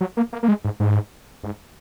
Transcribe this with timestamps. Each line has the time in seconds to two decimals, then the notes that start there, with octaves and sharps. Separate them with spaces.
0.01 F#3
0.17 A#3
0.33 A#3
0.43 A#3
0.48 G#3
0.64 G#2
0.80 G#2
1.43 G#2